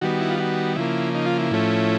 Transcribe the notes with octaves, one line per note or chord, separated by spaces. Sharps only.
D#3 G3 B3 F#4
E4
F4
F#4
C#3 F3 A#3 E4
D#4
F4
E4
A2 F3 A3 C#4